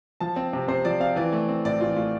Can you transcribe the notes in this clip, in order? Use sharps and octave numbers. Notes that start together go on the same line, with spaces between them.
F3 A5
C4
C3
C3 C5
F3 D5
C4 F5
E3 D5
A3
C4
A2 D5
E3 F4
A3 F4